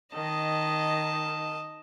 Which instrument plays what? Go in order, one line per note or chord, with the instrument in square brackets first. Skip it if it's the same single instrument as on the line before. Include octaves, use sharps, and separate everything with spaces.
[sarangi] D#3 [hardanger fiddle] D#5 A5